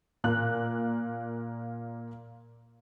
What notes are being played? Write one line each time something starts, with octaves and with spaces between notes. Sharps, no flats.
A#2 A#3 F#6